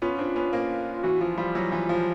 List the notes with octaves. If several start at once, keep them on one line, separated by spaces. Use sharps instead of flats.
B3 C#4 F4
C4 D4
B3 C#4
A#3 C4
E3 F#4
F3 F4
F3 G3 F4
E3 F#3
E3
F3